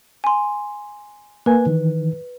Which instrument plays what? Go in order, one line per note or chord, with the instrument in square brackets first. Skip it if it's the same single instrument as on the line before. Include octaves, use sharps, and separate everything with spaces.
[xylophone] G#5 C6
[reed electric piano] A#3 G#5 [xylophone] B4
[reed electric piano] D#3 E3